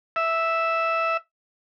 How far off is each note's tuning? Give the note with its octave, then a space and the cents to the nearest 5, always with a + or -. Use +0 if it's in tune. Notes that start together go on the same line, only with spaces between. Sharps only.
E5 -5